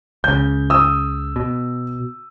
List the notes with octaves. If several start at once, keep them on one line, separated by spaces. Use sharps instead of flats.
C#2 C#3 G6
D#6 E6
B2